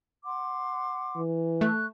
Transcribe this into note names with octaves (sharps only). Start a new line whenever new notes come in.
F#5 C6 D6
E3
A3 C#6 F#6